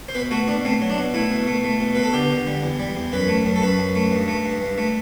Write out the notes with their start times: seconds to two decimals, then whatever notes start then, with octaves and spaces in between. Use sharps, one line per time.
0.09 C5
0.15 B2 B4
0.31 A3 F#4
0.48 B2 D4
0.65 A3 C4
0.81 F#3
0.90 D4
0.98 B2
1.14 A3 E4
1.31 B2
1.47 A3
1.64 A3
1.80 B2
1.95 B2 B4
2.03 A4
2.13 D3 G4
2.30 D3
2.47 G3
2.62 E2
2.80 G3
2.96 E2
3.13 F#2 B4
3.28 A3
3.45 F#2
3.56 A4
3.62 F#2 B4
3.79 F#2
3.96 A3
4.11 G2
4.28 A3
4.45 G2
4.61 G2
4.78 A3